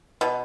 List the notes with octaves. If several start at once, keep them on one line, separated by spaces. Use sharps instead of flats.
B2